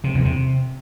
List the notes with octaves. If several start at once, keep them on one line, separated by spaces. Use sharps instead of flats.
C3
E2
C3